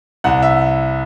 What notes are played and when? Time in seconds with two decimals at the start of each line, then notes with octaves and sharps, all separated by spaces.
0.24 C2 F#5
0.42 E5